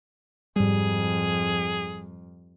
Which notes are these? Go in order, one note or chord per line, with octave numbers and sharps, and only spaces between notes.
F2 G#2 G3 G#4